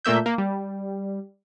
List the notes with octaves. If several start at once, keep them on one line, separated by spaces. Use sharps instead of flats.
A#2 A3 A#3 E5 G6
A#3
G3